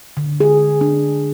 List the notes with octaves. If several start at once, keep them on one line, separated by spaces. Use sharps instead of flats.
D3
G#4
D4